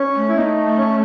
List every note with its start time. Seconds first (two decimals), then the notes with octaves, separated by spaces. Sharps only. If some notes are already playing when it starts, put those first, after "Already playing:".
Already playing: C#4
0.16 A3
0.29 E4
0.36 B3 D#4
0.41 A3
0.78 C#4